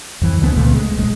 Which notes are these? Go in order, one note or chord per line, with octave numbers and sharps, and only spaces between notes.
F2 E3
D2 D3 B3
C#2 A#2 C#3 A3
G#3
D#1 G#3